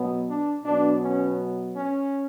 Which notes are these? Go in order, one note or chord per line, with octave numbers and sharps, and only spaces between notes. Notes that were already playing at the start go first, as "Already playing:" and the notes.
Already playing: B2 F#3 B3
D4
B2 F#3 B3 D4
C#4
C#4